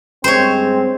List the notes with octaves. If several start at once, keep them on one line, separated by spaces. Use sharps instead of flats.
G2 G#3 C4 C5 C#5